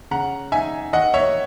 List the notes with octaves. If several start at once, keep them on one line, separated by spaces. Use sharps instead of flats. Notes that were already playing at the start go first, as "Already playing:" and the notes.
C#3 F#5 A#5
D#4 E5 G#5
D#3 D#5 F#5
C#5 E5